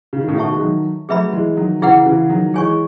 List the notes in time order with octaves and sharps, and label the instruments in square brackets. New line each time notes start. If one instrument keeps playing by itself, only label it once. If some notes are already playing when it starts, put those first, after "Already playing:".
[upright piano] C#3
D#3
A2 C#3
[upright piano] B2 D#3 [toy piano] A4 E5 A5 C#6
[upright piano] G#3
D#3 F#3
[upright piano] F#3 A3 [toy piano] G#4 B4 E5 B5
[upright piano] E3 G#3
D#3 F#3
[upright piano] C#3 E3 [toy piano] E4 G#4 B4 F#5
[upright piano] C#3 E3
D#3 F#3
[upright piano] E3 G#3 [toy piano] G#4 C#5 G#5 C#6